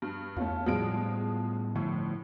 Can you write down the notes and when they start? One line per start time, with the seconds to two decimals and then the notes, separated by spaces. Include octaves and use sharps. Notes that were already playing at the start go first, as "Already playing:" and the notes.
0.02 G2
0.37 E2 A3 C#4 F4
0.66 A2 F3 G3 G#3 B3 D7
1.75 A2 D3 F3 A3